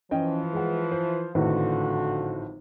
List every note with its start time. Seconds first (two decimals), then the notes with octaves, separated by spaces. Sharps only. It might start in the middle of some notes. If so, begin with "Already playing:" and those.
0.11 E3 F3 C#4 D#5 G5
0.53 G#3 F#5
0.92 C5
1.35 G#1 A2 D3 F3 F#4 B4